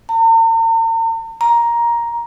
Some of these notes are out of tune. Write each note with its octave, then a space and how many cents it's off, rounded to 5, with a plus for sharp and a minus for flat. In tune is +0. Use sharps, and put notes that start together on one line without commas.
A#5 -45
A#5 +10